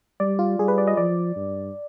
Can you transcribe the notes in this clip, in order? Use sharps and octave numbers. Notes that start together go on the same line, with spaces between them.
G3 D5
F4
G3 G#4
B4
D5
D#5
F3 D5
G2